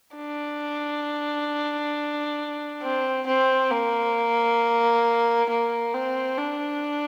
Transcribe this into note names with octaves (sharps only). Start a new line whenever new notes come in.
D4
C4
C4
A#3
A#3
C4
D4